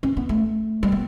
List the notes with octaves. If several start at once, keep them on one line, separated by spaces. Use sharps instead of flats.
C#4
B3
A3
G3
B3